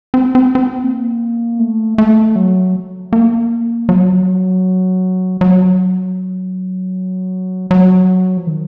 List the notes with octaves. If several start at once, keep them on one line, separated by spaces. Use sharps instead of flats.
C4
C4
C4
A#3
A3
A3
F#3
A#3
F#3
F#3
F#3
F3
D#3